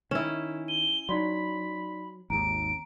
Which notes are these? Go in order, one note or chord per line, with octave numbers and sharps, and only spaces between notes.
D#3 C#4 E4 E7
D#7 G7
F#3 D#4 D5 B5 C6
G#1 D#2 A#5 D7